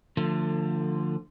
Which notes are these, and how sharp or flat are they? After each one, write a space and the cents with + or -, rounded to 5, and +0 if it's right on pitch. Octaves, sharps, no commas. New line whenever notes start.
D3 +20 F3 +0 A3 +35